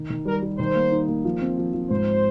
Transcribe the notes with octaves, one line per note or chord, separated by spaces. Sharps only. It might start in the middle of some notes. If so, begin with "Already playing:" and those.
Already playing: D#3
D#3
G3 A#4
G3
D#3 C5
A#3
D#4
A#3
F3
C4
F3
F3
G#2 C5